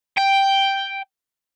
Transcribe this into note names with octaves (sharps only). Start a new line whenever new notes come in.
G5